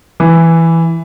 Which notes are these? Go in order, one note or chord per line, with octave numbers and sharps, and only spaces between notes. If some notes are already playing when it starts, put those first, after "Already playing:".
E3